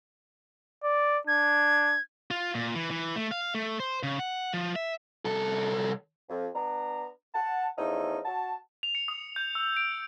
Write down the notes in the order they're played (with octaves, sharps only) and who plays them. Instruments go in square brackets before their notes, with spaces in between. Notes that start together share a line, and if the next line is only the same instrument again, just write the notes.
[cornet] D5
[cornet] D4 [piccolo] G#6
[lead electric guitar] F4
A#2
E3
E3
A3
F5
A3
C5
C#3
F#5
F3
E5
C2 A4
[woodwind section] F2
B3 D4 A#5
F#5 A5
E2 F3 A3 C#4 D#4
F#4 F#5 A5
[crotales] F7
C#7
D#6
G6
E6
D7